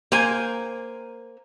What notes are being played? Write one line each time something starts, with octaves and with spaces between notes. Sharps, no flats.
A#3 C5 G#5